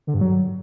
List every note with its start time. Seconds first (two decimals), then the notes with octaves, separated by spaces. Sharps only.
0.07 D3
0.14 G2
0.21 F#3